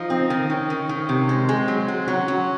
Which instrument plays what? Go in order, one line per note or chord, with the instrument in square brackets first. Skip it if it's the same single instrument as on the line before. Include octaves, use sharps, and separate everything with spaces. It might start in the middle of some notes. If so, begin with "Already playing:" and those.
Already playing: [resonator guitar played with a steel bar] F3 [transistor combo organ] D#4
[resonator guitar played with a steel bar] C4
D#3
[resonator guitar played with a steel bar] D#3 [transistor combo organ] C#4
[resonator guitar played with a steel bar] D#3
D#3
C3
[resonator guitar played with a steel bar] G#3 [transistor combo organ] C4
[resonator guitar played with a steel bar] G#3
F#3
F#3
[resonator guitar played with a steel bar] F#3 [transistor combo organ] C#4
[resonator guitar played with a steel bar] F#3